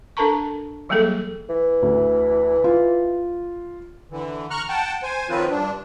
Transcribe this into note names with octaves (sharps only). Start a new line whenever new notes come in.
D4 A4 A#4 A5 A#5 C#6
E3 F#3 G3 A#3 G#4 A4
E3
D2
F4
D3 E3
A#5 C#6 F6 F#6
F#5 G5 A5
C5 G#5
D#3 F3 F#3 C4 F4 B4
G2 D4